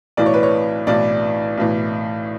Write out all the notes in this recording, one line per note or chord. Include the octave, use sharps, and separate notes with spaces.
B1 A2 E3 D5
C#5
B4
C#5
B1 A2 E3 D5
B1 A2 E3